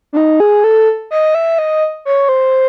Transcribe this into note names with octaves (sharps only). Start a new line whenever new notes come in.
D4
D#4
G#4
A4
D#5
E5
D#5
C#5
C5